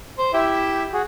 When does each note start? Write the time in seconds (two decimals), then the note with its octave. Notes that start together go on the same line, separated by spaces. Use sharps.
0.18 C5
0.33 E4 G4 E5
0.93 F#4 G#4